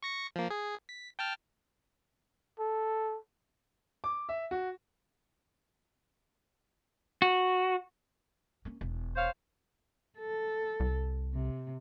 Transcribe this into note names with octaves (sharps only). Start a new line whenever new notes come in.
C#6 A#6 C#7
F3 A#3
G#4
B6
G5 A5 F6
A4
D6
E5
F#4
F#4
A#3 C#4
E1
C5 C#5 F5
A4
C2
C3